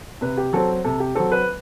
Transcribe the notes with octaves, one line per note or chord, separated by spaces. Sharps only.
C3 B4
G4
F#3 C4 A4
C3 A4
G4
F#3 C4 A4
B4